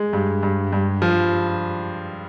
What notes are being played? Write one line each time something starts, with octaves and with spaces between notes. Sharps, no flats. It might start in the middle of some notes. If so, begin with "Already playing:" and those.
Already playing: G#3
G2
G2
G2
F3